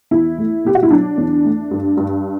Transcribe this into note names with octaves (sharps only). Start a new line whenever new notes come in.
E2 E4
A3
B2 G4
F#4
E4
F#3 D4
E2
A3
G2
G2